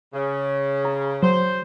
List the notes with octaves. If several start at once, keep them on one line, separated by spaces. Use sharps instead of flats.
C#3
A#5
F#3 C5